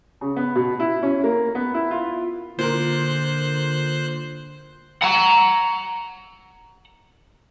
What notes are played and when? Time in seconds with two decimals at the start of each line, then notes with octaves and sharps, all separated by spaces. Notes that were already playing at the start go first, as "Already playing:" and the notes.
0.21 C#3
0.36 B3
0.55 B2
0.80 E4
1.03 C#4
1.24 A#3
1.55 B3
1.74 E4
1.91 F4
2.59 A#2 D3 A#4 C5 F#6
5.02 F#5 A#5